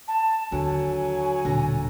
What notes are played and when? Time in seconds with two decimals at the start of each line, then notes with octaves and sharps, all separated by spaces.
0.08 A5
0.52 D#2 D3 F#3 G#5
1.45 D#1 B2 D3 A#5